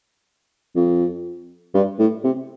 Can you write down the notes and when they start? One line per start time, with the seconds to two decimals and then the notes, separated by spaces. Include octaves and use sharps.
0.76 F2
1.74 G2
1.99 A2
2.24 C3